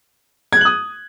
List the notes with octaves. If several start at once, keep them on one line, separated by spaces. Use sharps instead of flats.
D#6 F#6 G#6 F#7